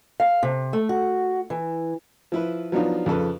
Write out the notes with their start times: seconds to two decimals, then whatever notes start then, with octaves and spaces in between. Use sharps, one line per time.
0.20 F5
0.43 C3
0.73 A3
0.89 F#4
1.50 E3
2.32 F3 E4 B4
2.72 F3 F#3 B3 D4 D#4 F4
3.06 F2 C#3 A4 B4